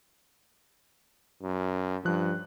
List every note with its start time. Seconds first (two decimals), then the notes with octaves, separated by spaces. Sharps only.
1.43 F#2
2.05 G2 F3 F#6